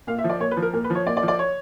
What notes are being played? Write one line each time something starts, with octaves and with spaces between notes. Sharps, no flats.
A#2 F5
E5
F3
D5
A#2 C#5
B4
F3
A#4
A#2 A#4
B4
F3
C#5
A#2 D5
D5
F3
D5
C#5